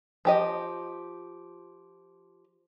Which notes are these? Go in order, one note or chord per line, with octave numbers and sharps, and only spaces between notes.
F3 G4 D#5